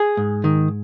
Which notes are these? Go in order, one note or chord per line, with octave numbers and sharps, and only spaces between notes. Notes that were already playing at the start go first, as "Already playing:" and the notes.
Already playing: G#4
G#2
D#3